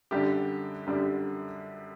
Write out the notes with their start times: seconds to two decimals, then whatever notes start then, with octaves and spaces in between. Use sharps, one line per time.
0.11 F#2 D3 G3 D4 G4
0.86 F#2 D3 G3 D4 G4